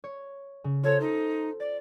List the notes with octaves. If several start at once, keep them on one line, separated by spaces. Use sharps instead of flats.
C#5
C#3
F4 A4 C5 C#5
D#4
D5 A6